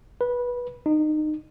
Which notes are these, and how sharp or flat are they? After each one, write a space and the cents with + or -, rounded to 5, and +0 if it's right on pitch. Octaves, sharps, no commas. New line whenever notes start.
B4 -15
D#4 -25